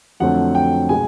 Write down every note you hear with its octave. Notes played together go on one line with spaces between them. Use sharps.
F2 D3 F#3 A3 C4 F#5
G5
B2 G#3 B3 G#5